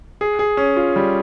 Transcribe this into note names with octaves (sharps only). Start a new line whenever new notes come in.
G#4
G#4
C#4
F4
G3